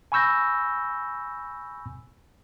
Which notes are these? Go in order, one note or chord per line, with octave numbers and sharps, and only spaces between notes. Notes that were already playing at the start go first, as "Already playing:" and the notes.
G#5 B5 C#6 E6 G6 A#6